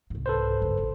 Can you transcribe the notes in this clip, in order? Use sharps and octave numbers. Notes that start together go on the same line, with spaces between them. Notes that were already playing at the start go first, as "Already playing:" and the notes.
C2 G#2
A4 B4 C5
G1 C#2
A1